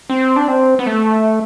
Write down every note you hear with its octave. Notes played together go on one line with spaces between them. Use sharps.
C4
D4
C4
B3
A3